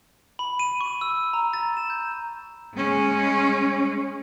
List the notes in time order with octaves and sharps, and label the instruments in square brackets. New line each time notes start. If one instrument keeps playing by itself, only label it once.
[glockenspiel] B5
D#7
C#6
E6
A#5
A6
E7
G6
[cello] G#3 C#4